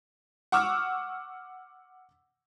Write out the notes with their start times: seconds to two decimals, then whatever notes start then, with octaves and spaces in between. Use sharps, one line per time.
0.52 F#5 C#6 D6 E6 F6